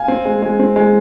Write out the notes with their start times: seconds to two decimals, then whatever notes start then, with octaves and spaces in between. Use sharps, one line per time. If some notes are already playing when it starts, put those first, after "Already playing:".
Already playing: F5 G#5
0.08 C4
0.25 G#3
0.42 G#3
0.60 C4
0.76 G#3